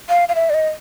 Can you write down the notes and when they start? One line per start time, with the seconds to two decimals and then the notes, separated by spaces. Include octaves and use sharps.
0.09 F5
0.29 F5
0.35 E5
0.50 D5
0.54 D#5